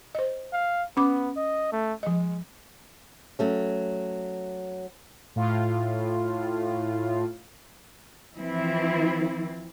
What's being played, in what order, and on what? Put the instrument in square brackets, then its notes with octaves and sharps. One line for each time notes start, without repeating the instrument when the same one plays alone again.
[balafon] C5 D#5
[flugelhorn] F5
[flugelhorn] B3 [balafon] C#4 D6
[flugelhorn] D#5
A3
[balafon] F3 D#5 [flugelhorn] G#3
[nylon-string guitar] F#3 A3 C#4
[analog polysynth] A2 F4
[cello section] E3 F3 C4 E4